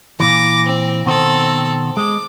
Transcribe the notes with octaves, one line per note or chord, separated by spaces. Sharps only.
A#2 E3 D6 A#6
C4
B2 D#3 C4 A4 C5
G#3 D6